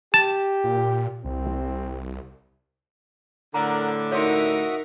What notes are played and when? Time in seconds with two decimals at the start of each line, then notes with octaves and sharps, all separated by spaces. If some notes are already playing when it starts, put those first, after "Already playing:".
0.14 G4 A5
0.64 A#2
1.25 C2 C4
3.54 A2 D3 A#4 F#5 A#5
4.12 D#4 F#4 A#4 C#5 E5 C6 D#6